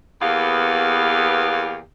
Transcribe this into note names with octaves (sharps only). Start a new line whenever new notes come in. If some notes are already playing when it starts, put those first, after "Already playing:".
E2 A#3 B3 G4 F5